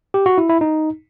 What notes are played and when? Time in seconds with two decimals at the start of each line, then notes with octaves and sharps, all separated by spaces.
0.14 G4
0.26 F#4
0.38 E4
0.49 E4
0.61 D#4